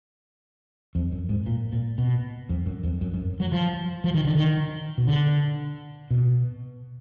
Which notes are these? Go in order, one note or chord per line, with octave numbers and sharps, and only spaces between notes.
F2
F#2
G#2
A#2
A#2
B2
F2
F#2
F2
F#2
F#2
F#3
F3
F3
D#3
D3
D#3
B2
D3
B2